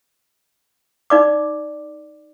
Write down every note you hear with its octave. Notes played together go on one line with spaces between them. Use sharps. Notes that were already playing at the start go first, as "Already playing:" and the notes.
D#4 D5 D6